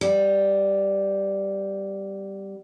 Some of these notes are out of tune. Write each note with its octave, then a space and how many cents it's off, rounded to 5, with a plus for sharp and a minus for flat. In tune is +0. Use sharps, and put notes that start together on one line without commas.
G3 +0 B3 +30